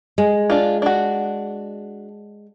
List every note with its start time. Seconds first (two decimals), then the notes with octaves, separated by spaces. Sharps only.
0.18 G#3
0.50 D4 F4
0.82 D4 F#4